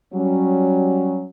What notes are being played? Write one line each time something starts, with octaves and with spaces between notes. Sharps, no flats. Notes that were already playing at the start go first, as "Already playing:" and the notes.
F#3 G3 C#4